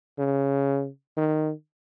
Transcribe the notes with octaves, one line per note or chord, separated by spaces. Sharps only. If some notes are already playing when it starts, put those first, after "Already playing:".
C#3
D#3